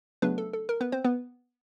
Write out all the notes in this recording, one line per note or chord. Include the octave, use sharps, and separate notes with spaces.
C#3 F#3 A3 B3 D4 B4
A4
A4
A#4
B3 B4
C4 C5
B3 B4